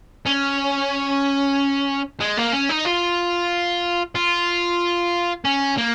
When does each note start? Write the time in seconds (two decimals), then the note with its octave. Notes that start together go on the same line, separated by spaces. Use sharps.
0.26 C#4
2.20 G#3
2.37 A#3
2.53 C#4
2.69 D#4
2.85 F4
4.15 F4
5.45 C#4
5.77 A#3